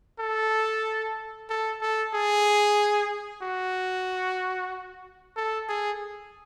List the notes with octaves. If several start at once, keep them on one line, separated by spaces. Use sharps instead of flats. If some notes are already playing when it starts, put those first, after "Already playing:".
A4
A4
A4
G#4
F#4
A4
G#4